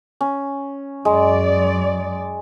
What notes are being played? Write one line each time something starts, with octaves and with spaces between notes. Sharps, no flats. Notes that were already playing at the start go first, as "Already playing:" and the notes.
C#4
F#2 G#3 D5